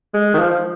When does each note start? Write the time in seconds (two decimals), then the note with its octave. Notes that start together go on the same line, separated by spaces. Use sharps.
0.14 G#3
0.34 D#3
0.39 F3